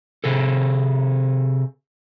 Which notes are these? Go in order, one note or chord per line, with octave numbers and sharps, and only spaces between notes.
C3 G#4 A4